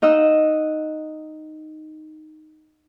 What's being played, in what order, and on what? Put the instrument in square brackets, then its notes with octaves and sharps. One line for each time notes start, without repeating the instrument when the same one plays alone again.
[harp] D#4 D#5 F#5 E6